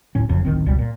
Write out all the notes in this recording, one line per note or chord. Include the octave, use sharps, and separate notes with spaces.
D1 A2 C#4
F#1 F2 C#3
D1 A1 D#3 C4
F#1 C#2 B2 G3
A#2